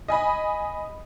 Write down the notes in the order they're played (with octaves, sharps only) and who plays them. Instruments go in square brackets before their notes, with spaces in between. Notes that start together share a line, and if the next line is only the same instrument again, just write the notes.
[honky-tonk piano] D#5 G#5 B5